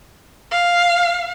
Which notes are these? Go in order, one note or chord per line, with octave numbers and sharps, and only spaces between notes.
F5